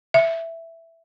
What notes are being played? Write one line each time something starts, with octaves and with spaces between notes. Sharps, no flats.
E5